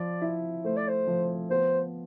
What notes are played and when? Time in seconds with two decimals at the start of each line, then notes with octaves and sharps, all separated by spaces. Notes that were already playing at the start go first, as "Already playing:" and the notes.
Already playing: F3 D5
0.22 E4
0.64 A3 C5
0.77 D5
0.88 C5
1.07 F3
1.50 B3 C5